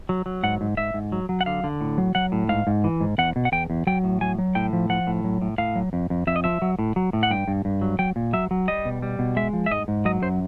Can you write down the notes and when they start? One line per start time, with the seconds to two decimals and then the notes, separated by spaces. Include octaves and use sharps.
0.09 F#3
0.26 F#3
0.43 G#2 F#5
0.61 G#2
0.77 G#2 E5
0.94 G#2
1.12 F#3
1.29 F#3
1.41 F#5
1.46 D3 F5
1.64 D3
1.81 A2
1.98 F#3
2.15 F#3 F#5
2.32 A2
2.49 G#2 F5
2.67 G#2
2.84 E3
3.00 G#2
3.18 E2 F#5
3.36 B2
3.45 F#5
3.52 E2 G5
3.70 E2
3.87 F#3 G5
4.04 A2
4.21 F#3 G#5
4.39 F#3
4.55 A2 G5
4.73 F3
4.90 F3 F#5
5.07 A2
5.24 F#3
5.42 A2
5.58 A2 F5
5.76 F#3
5.93 F2
6.10 F2
6.27 F2 E5
6.36 D#5
6.44 F3 E5
6.62 F#3
6.79 A2
6.96 F#3
7.13 A2
7.23 F#5
7.31 G2 G5
7.48 G2
7.65 G2
7.82 F#3
7.99 F#3 G5
8.16 A#2
8.33 F#3 E5
8.51 F#3
8.68 G3 D#5
8.85 B2
9.02 G3
9.19 B2
9.36 G#3 E5
9.53 F3
9.66 E5
9.71 G#2 D#5
9.88 G#2
10.05 F#3 D#5
10.22 F#2 C5